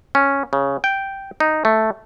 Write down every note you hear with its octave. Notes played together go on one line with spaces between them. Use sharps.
C#4
C#3
G5
D#4
A3